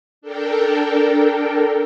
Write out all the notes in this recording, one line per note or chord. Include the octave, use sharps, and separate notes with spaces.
D4 A4 A#4 G5